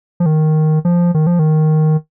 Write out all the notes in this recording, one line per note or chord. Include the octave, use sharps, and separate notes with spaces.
F3
D#3
F3
D#3
F3
D#3